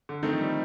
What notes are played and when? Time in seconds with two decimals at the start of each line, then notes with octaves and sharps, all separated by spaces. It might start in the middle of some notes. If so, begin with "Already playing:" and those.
0.09 D3
0.23 D#3 A3 C4 D#4 A4
0.32 F3
0.41 G3